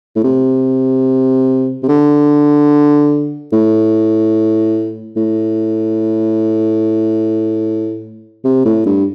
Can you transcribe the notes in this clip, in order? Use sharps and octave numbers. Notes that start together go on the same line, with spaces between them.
A2
C3
C3
D3
A2
A2
C3
A2
G2